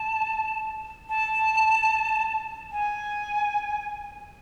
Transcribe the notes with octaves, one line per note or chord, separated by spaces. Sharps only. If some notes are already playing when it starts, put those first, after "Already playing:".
Already playing: A5
A5
G#5